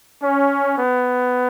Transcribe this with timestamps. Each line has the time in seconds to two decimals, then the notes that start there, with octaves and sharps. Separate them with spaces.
0.23 C#4
0.78 B3